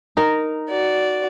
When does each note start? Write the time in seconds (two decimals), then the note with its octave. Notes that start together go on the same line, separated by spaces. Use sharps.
0.17 D#4 A#4
0.69 F#4 D5